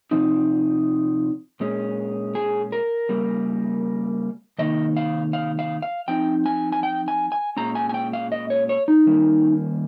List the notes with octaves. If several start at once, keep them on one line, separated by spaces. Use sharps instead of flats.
C3 F3 C4 D#4
A#2 G#3 C#4
G#4
A#4
C#3 G3 A#3
C3 D#3 A#3 D#4 D#5
F5
F5
F5
F5
F3 C4 D#4 G5
G#5
G#5
G5
G#5
G#5
A#2 G#3 C#4 A#5
G#5
G#5
G5
F5
D#5
C#5
C#5
D#4
D#3 G3 A#3 C#4